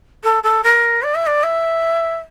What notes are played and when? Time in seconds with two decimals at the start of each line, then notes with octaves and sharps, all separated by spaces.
0.23 A4
0.43 A4
0.63 A#4
1.03 D5
1.14 E5
1.26 D5
1.43 E5